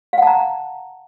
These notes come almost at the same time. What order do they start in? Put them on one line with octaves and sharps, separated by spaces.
F5 F#5 A5 A#5